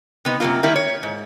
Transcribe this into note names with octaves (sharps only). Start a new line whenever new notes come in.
C3 B3 D#4
F#2 C3 G3 A#3 F4
D#3 G3 A#3 E4
C#5
G#2